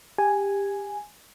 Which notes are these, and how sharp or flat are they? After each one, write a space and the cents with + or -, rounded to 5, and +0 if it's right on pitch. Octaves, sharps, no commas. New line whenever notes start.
G4 +20 G#5 +0